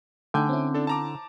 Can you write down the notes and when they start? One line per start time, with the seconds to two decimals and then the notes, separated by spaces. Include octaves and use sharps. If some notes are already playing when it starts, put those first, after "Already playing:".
0.34 D3 A3 D#4 G5 G#5 G6
0.49 C4 C#4 E4
0.74 D4 A4
0.87 A5 A#5 D6